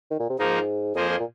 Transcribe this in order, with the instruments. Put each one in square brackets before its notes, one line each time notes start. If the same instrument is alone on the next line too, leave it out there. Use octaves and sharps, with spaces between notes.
[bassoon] D#3
A#2
C3
[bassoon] G#2 [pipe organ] F3 A#3 D#4 A#4
[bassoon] F2 [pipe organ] F3 A#3 G#4 C5 D#5
[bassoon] F2
A#2